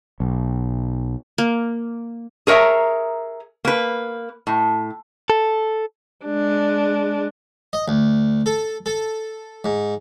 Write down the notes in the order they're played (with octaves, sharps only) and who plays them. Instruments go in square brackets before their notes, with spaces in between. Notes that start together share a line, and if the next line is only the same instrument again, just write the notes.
[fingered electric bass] B1
[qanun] A#3
[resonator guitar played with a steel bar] G#4 A#4 C#5 E5 A#5
A#3 B4
A2
[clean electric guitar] A4
[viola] G#3 D4
[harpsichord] D#5
D2
A4
A4
G#2